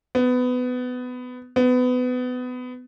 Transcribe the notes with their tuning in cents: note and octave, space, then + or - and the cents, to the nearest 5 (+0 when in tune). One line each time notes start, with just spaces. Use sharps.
B3 +20
B3 +25